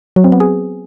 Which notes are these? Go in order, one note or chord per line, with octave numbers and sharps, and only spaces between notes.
F#3
C4
B3
G#4